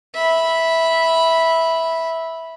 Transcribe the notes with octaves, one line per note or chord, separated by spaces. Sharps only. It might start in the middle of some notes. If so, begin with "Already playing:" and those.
E5 B5